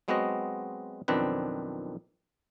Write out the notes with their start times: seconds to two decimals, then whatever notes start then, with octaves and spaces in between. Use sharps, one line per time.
0.08 F#3 G#3 B3 C4 F#4 D#5
1.08 B1 F2 D#3 C4 D4 B4